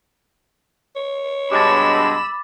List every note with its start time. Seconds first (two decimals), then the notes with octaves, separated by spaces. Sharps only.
0.96 C#5
1.52 G2 B2 G#3 B5 D6 E6 A6